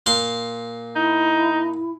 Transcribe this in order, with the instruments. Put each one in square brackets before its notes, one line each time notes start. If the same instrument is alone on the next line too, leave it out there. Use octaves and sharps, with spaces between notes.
[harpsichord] A#2 F5 C6
[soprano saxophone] D#4 [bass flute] E4